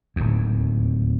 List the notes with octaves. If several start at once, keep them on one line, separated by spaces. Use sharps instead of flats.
D1 D#2